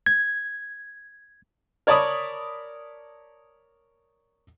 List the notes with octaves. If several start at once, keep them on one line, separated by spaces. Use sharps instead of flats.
G#6
A#4 C#5 D5 A5 B5 D#6